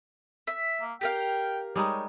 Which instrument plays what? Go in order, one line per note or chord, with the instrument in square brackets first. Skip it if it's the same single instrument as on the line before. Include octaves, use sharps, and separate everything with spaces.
[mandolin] E5
[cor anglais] A#3
[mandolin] G4 A#4 F5 [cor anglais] G5
[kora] G3 G#3 D#4 [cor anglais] C#5